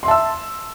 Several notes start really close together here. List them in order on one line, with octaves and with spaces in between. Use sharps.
C6 E5 A5 E6